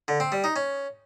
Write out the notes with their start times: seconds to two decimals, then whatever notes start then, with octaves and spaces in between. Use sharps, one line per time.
0.08 D3
0.20 C4
0.32 G3
0.44 D#4
0.56 C#4